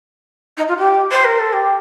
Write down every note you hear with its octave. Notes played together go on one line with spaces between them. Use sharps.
D#4
F4
G4
C5
A#4
A4
G4